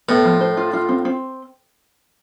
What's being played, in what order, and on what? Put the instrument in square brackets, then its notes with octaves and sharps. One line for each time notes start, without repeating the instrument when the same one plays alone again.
[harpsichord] A2 [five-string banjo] B3
[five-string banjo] F3
C5
F4
F4
C4
C4